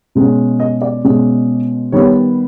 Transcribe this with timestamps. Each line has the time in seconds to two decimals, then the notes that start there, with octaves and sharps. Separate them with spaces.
0.15 B2 G#3 C#4
0.60 D#5
0.82 D5
1.04 B2 G#3 C#4
1.92 D#3 G3 B3 C#5